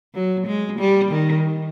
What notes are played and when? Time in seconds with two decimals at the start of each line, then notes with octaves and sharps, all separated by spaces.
0.15 F#3
0.47 G#3
0.79 G3
1.11 D#3